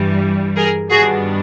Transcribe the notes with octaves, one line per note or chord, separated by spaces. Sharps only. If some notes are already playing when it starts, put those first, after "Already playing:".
Already playing: G2 E3 G3
G#4 A#4
G2 D#3 G3 B3 D4 F#4 G#4